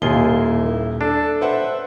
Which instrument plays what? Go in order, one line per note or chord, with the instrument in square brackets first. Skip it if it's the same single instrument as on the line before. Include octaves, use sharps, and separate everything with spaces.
[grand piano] D#1 A#2 G7 [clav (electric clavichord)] D#2 F4 G#4 [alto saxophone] E4
[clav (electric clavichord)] D4 [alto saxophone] A4
[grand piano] B4 C5 F#5 [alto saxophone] E5